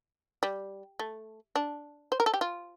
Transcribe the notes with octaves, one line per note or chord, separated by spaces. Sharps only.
G3
A3
D4
C5
A#4
A4
G4
F4